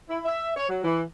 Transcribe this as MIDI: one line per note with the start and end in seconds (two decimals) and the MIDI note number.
0.09 0.19 64
0.25 0.52 76
0.56 0.68 73
0.69 0.82 54
0.84 1.02 52